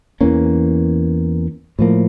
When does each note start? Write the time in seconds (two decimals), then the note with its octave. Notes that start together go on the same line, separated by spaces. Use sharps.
0.21 E2 E3 A#3 C#4
1.79 A2 F3 A#3